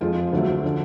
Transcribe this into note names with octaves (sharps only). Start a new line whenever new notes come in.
F2 F3 G#3 F4
D2 D3 F#3 A3
D3 F3